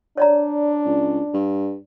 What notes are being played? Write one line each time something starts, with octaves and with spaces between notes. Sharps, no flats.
D4 C#5 D5 A#5
C#2
G2